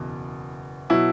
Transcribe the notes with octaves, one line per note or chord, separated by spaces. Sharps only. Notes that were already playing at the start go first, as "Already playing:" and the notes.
Already playing: F#1 E2 B2
B2 F#3 E4